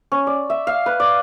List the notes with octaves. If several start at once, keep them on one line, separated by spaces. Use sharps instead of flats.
C#4
D5
E5
F5
B4
D5